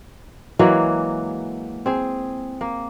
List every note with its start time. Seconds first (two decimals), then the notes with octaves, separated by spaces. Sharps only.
0.59 E3 F#3 G#3 A#3
1.86 C4 G#4
2.61 A#3